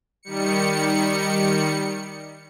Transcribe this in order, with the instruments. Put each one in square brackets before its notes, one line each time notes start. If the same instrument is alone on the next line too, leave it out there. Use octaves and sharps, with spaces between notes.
[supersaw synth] D#3 G3 C#7